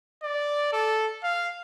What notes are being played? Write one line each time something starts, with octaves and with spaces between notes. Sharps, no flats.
D5
A4
F5